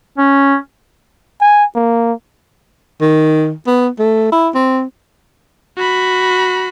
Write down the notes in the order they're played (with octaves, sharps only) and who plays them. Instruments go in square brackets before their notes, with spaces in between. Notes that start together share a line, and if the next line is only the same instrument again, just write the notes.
[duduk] C#4
[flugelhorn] G#5
A#3
[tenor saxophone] D#3
B3
A3
E4
C4
[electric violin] F#4 B5